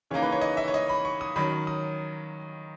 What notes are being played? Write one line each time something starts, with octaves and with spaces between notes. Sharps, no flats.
C#3 E3 A#3 D#4 C#5
B4
C#5
D#5
E5
C#5
D#5
B5
C#6
D#6
D#3 F#3 C#4 B5
D#6